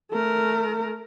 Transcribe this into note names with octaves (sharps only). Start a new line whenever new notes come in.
A3 A#4